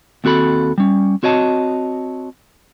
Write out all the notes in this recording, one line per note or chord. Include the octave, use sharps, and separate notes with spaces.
D#2 C4 F#4 A4 B5
G3 C#4
C4 F#4 C#5 D#5 A5